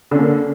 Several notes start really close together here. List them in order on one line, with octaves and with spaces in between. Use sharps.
D3 C#4 A#3